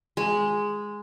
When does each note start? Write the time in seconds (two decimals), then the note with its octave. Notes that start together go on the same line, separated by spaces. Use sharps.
0.17 G#3